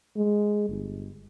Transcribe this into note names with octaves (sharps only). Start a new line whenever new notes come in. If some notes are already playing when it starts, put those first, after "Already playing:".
G#3
G1